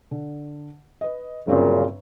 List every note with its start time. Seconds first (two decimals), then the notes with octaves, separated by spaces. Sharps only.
0.11 D3
1.01 B4 D#5
1.47 G1 F#2 A#2 C#3 C4 C#5